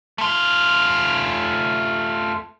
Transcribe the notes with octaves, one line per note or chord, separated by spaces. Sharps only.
A3 F4